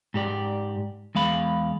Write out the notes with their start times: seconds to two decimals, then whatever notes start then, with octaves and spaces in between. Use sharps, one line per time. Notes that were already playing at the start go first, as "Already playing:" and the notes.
0.14 G#2 G4 D5 G5
1.15 E2 G#3 F5 B5